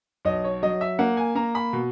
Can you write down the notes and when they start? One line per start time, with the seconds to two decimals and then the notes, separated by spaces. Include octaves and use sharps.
0.25 B1 D#5
0.44 C#5
0.63 F#3 D#5
0.81 E5
0.99 A#3 F#5
1.17 G#5
1.35 A#3 A#5
1.55 B5
1.73 B2